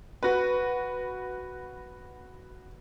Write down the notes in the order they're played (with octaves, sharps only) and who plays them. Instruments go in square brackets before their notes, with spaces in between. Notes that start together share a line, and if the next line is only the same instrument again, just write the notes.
[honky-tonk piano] F#4 B4